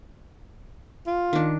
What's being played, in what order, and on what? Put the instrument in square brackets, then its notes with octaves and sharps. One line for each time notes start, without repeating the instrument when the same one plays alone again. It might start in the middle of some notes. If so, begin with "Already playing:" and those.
[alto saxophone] F4
[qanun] D#3 D4